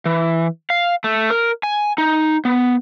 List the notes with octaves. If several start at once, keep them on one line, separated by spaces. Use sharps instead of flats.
E3
F5
A3
A#4
G#5
D#4
B3